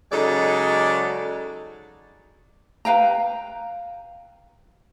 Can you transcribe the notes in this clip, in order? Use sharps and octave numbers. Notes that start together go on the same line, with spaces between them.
C#3 F#3 G#3 D#4 A4 D5
B4 F5 G5 A#5